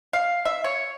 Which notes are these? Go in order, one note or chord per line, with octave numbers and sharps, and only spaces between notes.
F5
E5
C#5